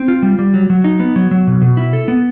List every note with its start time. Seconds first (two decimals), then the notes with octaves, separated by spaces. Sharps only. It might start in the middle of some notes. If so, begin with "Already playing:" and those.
Already playing: C4
0.08 F4
0.23 G3
0.39 G3
0.54 F#3
0.70 F#3
0.84 D#4
1.00 B3
1.16 F#3
1.31 F#3
1.47 B2
1.62 B2
1.77 E4
1.93 A4
2.08 B3